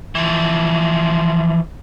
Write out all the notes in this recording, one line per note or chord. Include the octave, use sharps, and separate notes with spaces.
E3 F3